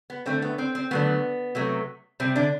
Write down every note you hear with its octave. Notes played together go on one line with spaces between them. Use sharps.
B3
D3 A3 C4
B3
C4
C4
D3 F#3 A3 B3
C3 F#3 A3
C3 G3 C4
D3 D4